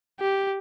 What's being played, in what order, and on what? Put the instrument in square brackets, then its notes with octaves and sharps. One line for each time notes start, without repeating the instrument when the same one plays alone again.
[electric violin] G4